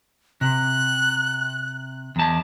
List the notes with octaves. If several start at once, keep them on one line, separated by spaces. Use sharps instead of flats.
C3 F#6
E2 A5